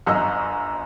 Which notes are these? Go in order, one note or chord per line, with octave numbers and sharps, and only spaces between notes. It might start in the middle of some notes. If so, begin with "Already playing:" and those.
G1 F#2 D#5 A#5 E6